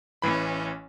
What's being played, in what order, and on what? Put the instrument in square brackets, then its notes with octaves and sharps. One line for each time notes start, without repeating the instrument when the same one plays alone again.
[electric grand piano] A1 E3 B5 [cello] C#4